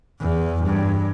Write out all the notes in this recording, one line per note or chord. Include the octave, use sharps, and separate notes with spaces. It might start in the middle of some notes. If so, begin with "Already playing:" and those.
E2
G2